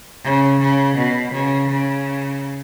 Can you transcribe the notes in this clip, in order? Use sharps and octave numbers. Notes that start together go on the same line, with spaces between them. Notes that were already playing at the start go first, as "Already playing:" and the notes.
C#3
C#3
B2
C#3
C#3